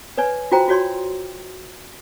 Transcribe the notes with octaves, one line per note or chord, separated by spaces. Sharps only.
B4 C#5 D5 G#5
F4 F#4 C5 G5 A#5
F4 F#4 C#5 D5 C6